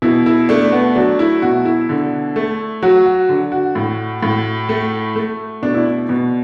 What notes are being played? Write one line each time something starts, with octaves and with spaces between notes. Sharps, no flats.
B2 E4
E4
A3 D4
B3
F#3 D4
E4
B2 F#4
E4
D3
A3
F#3 F#4
F#4
D3
F#4
A2
A2
A3
A3
B2 D4
E4
D4
B2